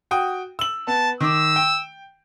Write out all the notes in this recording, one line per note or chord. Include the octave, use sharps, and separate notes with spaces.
F#4 G5 D#6
E6 F#7
B3 A5
D#3 D6 E6
G5